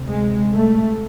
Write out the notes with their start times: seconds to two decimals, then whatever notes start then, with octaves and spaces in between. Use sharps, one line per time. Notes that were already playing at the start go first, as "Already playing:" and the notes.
Already playing: D2 C3
0.08 G#3
0.52 A3